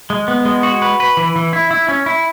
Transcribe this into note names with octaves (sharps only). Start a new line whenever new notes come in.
G#3
B3
G#3
F#4
B4
B4
E3
E3
E4
E4
C#4
E4